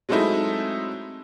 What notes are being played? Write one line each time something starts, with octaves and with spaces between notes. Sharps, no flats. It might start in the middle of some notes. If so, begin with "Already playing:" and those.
F#3 G#3 A3 C4 D#4 E4